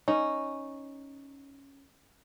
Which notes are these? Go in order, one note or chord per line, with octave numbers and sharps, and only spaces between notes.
C#4 D#4